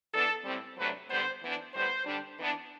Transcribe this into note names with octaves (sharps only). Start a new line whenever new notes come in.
E3 B3 D4 A4
A2 G3 C4
C3 F#3 A3 D4 B4
D3 G3 B3 C5
E3 B3 D4
A2 G3 B3 C5
D3 G3 D4
E3 B3 D4